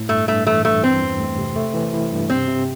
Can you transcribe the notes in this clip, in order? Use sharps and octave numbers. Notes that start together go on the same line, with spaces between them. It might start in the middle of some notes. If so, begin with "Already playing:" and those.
Already playing: A2
G2 A3
G2 A3
E3 A3
G2 A3
E3 C4
E2
A3
C3
A3
E3
E4
G2
C3 C4
C3